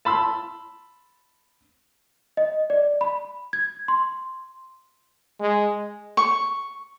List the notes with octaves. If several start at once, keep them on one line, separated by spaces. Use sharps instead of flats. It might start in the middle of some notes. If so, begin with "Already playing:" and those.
A5 B5 C6 E6
D#5
D5
B5
G#6
C6
G#3
C#6